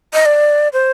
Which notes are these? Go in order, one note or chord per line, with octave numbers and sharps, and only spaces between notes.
D#5
D5
C5